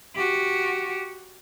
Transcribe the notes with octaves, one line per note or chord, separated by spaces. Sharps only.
F#4 G4